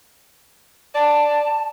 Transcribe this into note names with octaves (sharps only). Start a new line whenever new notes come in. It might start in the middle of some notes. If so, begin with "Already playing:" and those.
D5 A5